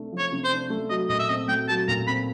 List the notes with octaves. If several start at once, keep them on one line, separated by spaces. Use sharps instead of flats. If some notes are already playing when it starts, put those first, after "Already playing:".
Already playing: C3 A3 D4
F3
C#5
C3
C5
D4
A3
F#3 D#5
A#2 D#5
E5
C4 D#5
A3 G5
F#3 A5
A#2 A#5
C4 B5